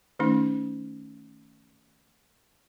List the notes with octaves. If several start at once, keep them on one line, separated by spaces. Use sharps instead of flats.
D#3 A3 C#4 D#4